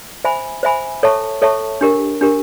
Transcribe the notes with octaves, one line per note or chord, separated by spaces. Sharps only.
C5 E5 G#5 B5
C5 E5 G#5 B5
A4 C#5 E5 A5 C#6
A4 C#5 E5 A5 C#6
D4 G4 A#4
D4 G4 A#4